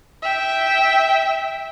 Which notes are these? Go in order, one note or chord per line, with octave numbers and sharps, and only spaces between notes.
E5 G5